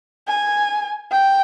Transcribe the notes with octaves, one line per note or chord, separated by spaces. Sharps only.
G#5
G5